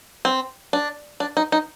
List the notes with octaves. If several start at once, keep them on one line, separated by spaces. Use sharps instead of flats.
C4
D4
D4
D#4
D#4